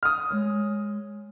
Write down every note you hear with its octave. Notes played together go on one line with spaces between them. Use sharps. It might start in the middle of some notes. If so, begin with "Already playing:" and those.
D#6 F6
G#3 C#5